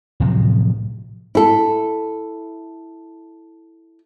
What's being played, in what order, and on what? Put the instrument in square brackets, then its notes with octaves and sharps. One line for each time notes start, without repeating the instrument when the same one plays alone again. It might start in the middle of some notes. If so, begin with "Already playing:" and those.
[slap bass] A2 C3 F3 F#3
[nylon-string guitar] E4 A4